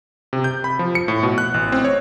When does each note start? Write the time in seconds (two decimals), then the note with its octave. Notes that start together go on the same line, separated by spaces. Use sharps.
0.33 C3
0.44 G6
0.64 B5
0.79 F3
0.95 C#7
1.08 A2
1.23 B2
1.38 F#6
1.54 A1
1.72 C4
1.85 C#5